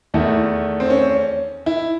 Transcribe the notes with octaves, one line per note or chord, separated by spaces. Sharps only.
E2 D#3 A3 E4
C4
C#4
E4